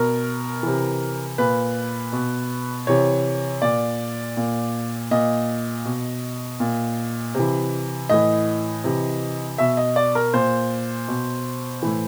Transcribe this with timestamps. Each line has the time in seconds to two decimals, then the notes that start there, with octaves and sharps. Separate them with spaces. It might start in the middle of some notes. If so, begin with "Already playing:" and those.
Already playing: B2 A#4
0.63 C3 E3
1.38 A#2 B4
2.13 B2
2.87 C3 E3 C#5
3.62 A#2 D5
4.37 A#2
5.11 A#2 D#5
5.85 B2
6.60 A#2
7.35 C3 E3
8.09 A2 E3 D#5
8.84 C3 E3
9.58 B2 E5
9.77 D#5
9.96 D5
10.15 A#4
10.34 A#2 C5
11.08 B2
11.82 A2 E3